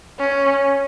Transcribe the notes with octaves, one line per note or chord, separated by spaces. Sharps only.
C#4